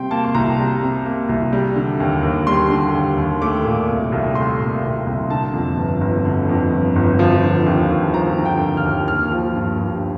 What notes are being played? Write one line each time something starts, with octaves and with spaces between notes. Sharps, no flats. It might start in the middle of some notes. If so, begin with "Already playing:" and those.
Already playing: C3 G3 G5 C6
A#3 A5
C6
C2 A#5
G3
C3
A#3
C2
G3
D3
D#2
D#2
G3 C6
D3
D#2
D#2
A3 D6
A#2
C2
C2
A3 C6
A#2
C2
C2
D3 A5
F2
G1
G1
D3
F2
G1
G1
F3
D3
D#2
D#2
F3 A#5
D3
G5
D#2
F6
D#2
A#3 F6
F3
G2
G2